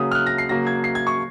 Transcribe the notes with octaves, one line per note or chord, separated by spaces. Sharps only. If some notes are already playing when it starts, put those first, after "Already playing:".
Already playing: C#3 F#3 A#3 D#6
F6
F#6
A#6
C7
C#3 F#3 A#3 A#6
G#6
C7
G#6
C#6